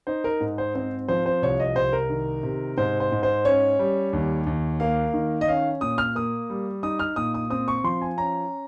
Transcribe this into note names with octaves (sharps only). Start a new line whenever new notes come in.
D#4 C5
A#4
G#2
C5
C4 C5
F3 C5
C5
C2 C#5
D#5
C2 C5
A#4
D#3
C3
G#2 C5
C5
G#2
C5
C#4 C#5
G3
D#2
D#2
A#3 F5
D#3
D#5
C#4 F5
A#2 D#6
F6
A#3 D#6
G3
D#4 D#6
F6
A#2 D#6
D#6
C4 D#6
C#6
F3 C6
G#5
C#4 A#5